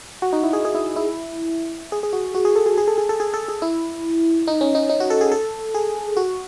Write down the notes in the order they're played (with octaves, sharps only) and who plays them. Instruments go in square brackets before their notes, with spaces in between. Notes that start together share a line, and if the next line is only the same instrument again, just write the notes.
[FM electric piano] F#4
D#4
E4
G#4
G#4
E4
E4
G#4
G#4
F#4
F#4
G#4
A4
G#4
G#4
A4
G#4
A4
G#4
A4
G#4
E4
D#4
C#4
D#4
D#4
F#4
A4
G#4
A4
G#4
F#4